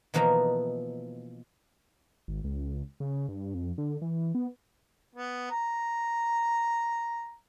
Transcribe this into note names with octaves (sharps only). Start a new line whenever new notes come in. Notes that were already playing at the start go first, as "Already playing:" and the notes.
B2 E3 F3 A#3 D#4 A#5
G#1
C#2
C#3
G2
F2
D3
E3
B3
B3
A#5